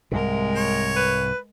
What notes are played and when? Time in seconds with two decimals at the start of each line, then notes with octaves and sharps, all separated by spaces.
0.11 C2 G#2 C3 G#3 A#4
0.56 C#5
0.96 B4